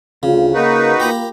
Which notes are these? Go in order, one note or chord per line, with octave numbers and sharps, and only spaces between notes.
D2 C#3 F4
A#3 D#4 F#4 A#4 B4
A#3 F4 G4 A#5 B5